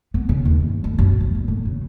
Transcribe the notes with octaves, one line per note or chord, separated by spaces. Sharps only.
B3
C#3
D#2
G2
D2
F#2
F2
A2
A2
C#3